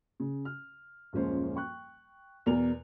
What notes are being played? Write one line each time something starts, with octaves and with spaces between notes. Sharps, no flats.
C#3
F6
D#1 F#2 F3 G#3 C#4 C5
G5 C#6 F#6
E2 B2 A#4 D5 F7